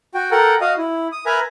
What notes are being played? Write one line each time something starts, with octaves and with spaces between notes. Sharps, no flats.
F#4 G5
A4 A#4 F#5 G5
F#4 D#5 F5 D#6
E4
D#6
A#4 B4 E5 G#5 A#5